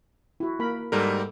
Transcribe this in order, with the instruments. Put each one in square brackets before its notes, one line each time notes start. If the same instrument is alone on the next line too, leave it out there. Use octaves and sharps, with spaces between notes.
[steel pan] E4 F#4
A#3 A#4 B5
[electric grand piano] G#2 G3 A#4 [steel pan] A4